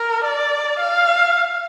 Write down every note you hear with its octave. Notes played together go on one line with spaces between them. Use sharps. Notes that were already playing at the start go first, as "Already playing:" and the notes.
Already playing: A#4
D5
F5